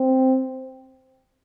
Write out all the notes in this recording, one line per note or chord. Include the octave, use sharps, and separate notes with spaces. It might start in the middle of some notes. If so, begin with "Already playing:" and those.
Already playing: C4